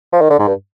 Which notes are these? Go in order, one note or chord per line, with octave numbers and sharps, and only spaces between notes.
F3
D#3
D3
G#2
G2